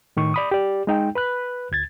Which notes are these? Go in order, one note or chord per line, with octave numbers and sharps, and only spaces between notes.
A2 D#3 C#6
D5 B5 D#6
G4 D5
G#3 D#4 G5
B4 B5 F#6
D2 G#6 A6